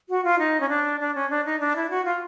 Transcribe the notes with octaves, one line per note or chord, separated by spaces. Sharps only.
F#4
F4
D#4
C#4
D4
D4
C#4
D4
D#4
D4
E4
F#4
F4